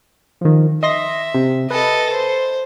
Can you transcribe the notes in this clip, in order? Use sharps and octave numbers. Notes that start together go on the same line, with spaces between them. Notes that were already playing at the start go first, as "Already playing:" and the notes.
D#3 F3
D#5 E5 C6 A#6
C3
A4 B4 D#5
C5